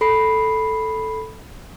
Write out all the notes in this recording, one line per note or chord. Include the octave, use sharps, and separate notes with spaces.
A4 B5 C7